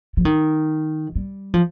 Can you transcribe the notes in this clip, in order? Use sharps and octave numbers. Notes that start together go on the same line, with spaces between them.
F3
D#3
G3
F3